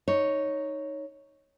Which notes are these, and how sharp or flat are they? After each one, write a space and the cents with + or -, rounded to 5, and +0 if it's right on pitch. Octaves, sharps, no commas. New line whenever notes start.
D#4 +0 C#5 +0